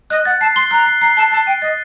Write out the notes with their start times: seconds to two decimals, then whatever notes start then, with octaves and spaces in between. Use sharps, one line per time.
0.10 D#5 F#6
0.25 F#5 A6
0.41 A5 C7
0.56 C6 G7
0.71 A#5 F#6
0.87 C7
1.01 A#5 C7
1.17 A5 G7
1.32 A5 A6
1.47 G5 D#7
1.62 D#5 A6